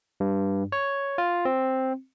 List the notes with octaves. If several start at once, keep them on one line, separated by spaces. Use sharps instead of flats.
G2
C#5
F4
C4